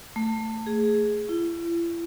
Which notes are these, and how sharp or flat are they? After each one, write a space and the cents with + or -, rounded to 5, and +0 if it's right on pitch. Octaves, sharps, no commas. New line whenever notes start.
A3 +25
G#4 +5
E4 +40